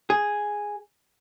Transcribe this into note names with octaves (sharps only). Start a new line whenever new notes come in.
G#4